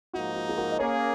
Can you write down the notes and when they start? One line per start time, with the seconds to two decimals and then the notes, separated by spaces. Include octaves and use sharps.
0.13 G#2 F3 A#3 D#4 F#4
0.35 F#4
0.49 G#4
0.58 F#4 A#4
0.72 D#5
0.79 A#3 C#4 G#4 A#4 C#5